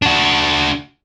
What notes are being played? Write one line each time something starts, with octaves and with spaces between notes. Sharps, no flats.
D4 F#4